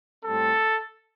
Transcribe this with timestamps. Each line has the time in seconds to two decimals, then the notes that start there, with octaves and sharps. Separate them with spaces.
0.24 A2 G3 C4 A4